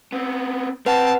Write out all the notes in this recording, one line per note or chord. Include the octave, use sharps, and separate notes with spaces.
B3 C4
C4 B4 F#5 A5